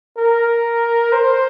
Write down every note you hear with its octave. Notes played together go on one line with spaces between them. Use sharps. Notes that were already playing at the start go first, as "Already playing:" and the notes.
A#4
C5